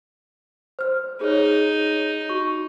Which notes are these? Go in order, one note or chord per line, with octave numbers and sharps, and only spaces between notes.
C5 F6
D#4 G#4 C#5
F#4 C#6